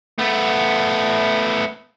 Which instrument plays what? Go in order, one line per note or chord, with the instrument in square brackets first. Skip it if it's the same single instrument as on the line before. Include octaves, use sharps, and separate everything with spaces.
[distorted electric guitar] A3 B3